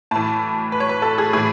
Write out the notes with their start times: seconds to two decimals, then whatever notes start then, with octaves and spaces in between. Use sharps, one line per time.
0.11 A2 E3 A5
0.72 B4
0.80 C#5
0.89 B4
1.02 A4
1.18 G#4
1.33 A2 E3 G#4